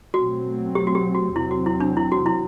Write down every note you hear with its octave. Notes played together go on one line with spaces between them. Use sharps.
B2 F#3 A3 C4 F#4
G4
F#4
G4
F#4
E2 C3 F#3 C4 E4
F#4
E4
D4
E4
F#4
E4